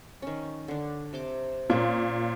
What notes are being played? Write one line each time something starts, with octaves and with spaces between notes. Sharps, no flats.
D#3 C#4
D3 D4
C3 C6 D6
A#2 A#3 C4 C#4